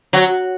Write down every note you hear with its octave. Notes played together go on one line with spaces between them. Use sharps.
F#3